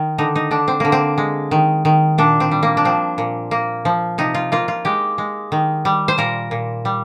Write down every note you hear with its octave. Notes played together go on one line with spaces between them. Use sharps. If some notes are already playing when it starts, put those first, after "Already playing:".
Already playing: D#3
D3 D#4
D#4
D3 D4
C4
D3 A#3
C4
G#3
D#3
D#3
A#2 D4
C4
G3
A#3
D4
F3 C4
A#2
A#3
F3
C3 D#4
F4
A#3 F4
F4
G#3 G4
G#3
D#3
G3
C5
A#2 A#4
A#2
G3